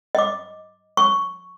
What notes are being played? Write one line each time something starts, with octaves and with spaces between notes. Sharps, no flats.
D#5 D6
C#6